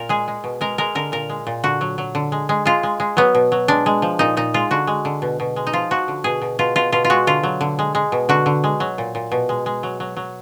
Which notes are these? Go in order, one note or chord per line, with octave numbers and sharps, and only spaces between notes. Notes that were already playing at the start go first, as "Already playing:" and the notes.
Already playing: A#2 A#4
G#3 G#4
G#3
B2
G#3 A#4
G#3 A#4
D3 A#4
A#2 A#4
G#3
A#2
D3 F#4
F#3
F#3
D3
G#3
G#3
G#3 F4
G#3
G#3
F#3 B3
B2
F#3
G#3 D4
G#3
F3
A#2 D#4
A#2 D#4
G#3 F4
D3 F#4
G#3
D3
B2
B2
G#3
D#4
F3 F4
F3 F#4
D3
B2 G#4
B2
B2 F4
B2 F4
B2 F4
F4
G#3 F#4
D3 F4
F#3
D3
G#3
G#3
B2
D3 F#4
D3
G#3
F#3
A#2
A#2
B2
G#3
G#3
F#3
F#3
F#3